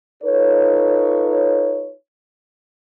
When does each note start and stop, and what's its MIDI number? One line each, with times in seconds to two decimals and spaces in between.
0.23 1.93 63
0.23 1.93 65
0.23 1.93 69
0.23 1.93 71
0.23 1.93 73